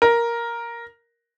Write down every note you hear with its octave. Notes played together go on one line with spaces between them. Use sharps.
A#4